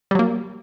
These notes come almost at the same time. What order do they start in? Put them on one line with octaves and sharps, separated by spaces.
G3 F#3 A#3